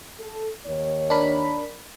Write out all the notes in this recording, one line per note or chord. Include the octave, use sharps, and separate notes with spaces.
A4
D#2 D#3 C#5
D4 A#4 B5